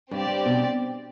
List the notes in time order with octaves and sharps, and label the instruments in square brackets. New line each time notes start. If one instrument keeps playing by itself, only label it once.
[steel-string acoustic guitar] G2 [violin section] C4 G4 D5
[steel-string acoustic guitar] G2
B2